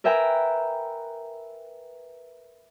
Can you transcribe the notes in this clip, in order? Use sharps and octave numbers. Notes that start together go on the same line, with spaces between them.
A#4 B4 E5 G5 G#5 A#5